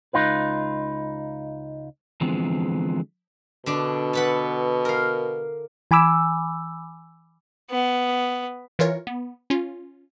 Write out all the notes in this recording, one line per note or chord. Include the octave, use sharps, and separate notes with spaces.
C#2 G#2 D#4 F4 B4
D3 E3 F3 G#3 B3 C4
B2 D3 D4
A4 B4 F#5
A#4 F5
E3 G#5 B5 D6 E6
B3
E3 F4 A#4 C#5
B3
C#4 F4